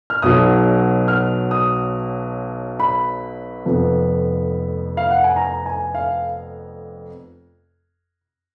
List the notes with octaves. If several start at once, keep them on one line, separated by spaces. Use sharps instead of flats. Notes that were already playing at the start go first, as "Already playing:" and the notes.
F6
B1 B2 F#3 D#6
F6
D#6
B5
F1 F2 F3 B3
F5
F#5
G#5
A#5
G#5
F5